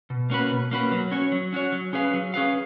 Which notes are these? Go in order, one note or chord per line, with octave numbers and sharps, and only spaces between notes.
B2
A#3 C#4 F#4 B4
B2
A#3 C#4 F#4 B4
F#3
C#4 F#4 C#5
F#3
C#4 F#4 C#5
F#3
C#4 G#4 B4 F5
F#3
C#4 G#4 B4 F5